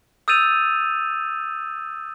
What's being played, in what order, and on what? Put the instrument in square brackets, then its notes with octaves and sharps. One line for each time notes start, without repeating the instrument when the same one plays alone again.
[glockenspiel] D#6 E6 G6 A6 D#7 F7